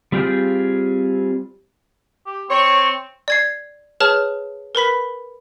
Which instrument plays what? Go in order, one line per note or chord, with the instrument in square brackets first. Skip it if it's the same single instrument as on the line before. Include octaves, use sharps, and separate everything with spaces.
[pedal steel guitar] G3 C4 F4 G#4 G5
[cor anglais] G4
[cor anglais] C4 [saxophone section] C#5
[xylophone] D5 G#6 C7
G#4 B4 C#5 A5 F6 E7
A#4 B4 B5 B6